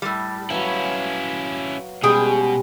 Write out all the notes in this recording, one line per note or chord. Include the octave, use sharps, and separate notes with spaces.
A2 G3
F#3 C#4 E4 B4 F5 G#5
B2 G3 G#3 C#4 G#4 G5 D#6